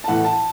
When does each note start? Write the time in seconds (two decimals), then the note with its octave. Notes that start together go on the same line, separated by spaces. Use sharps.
0.04 A5
0.08 A2 E3 F#5
0.24 A5